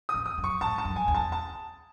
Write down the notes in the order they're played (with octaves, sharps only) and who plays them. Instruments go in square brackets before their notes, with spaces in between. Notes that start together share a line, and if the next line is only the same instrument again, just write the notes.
[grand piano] D#6
[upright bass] E2
[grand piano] D#6
[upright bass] F#2
[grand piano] C#6
[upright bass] G#2 [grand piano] A5
[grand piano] A5
[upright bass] F#2
[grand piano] G#5
[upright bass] E2 [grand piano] G#5
[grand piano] A5
A5